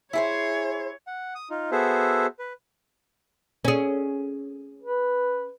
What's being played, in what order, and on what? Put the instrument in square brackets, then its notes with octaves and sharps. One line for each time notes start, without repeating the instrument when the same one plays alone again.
[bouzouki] E4 G#4 C5 [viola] C#5
[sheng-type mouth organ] F#5
D#6
D#4 F4
B3 F#4 G#4 A4 C5 E5
B4
[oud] C#4 G#4
[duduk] B4